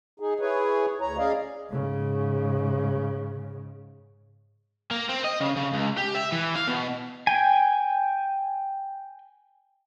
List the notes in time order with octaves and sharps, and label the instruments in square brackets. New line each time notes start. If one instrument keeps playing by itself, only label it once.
[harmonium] D#4 G#4
E4 G#4 B4 C#5
D2 C#5 A#5
C#4 G#4 D5 D#5 F5
[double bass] G#2 C#3
[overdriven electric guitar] A#3
C4
D#5
C#3
C#3
C#2
G4
E5
E3
F5
B2
[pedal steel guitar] G5 G#5